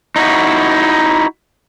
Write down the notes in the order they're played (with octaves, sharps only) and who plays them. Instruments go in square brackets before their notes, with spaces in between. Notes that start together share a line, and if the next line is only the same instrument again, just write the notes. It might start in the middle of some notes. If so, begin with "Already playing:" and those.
[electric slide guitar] D#4 E4 F#4